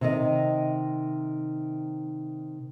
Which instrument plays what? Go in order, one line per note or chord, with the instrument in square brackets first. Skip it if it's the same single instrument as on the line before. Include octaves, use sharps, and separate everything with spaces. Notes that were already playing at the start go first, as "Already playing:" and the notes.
[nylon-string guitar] C3 D#3 D#5